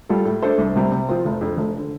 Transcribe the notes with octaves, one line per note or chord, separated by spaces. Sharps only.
G3 F4 A4
A2
A3 D4 A4 C5
C2
C3 G3 C4
C3
F3 C4 F4
F1
F2 D3
F1
D3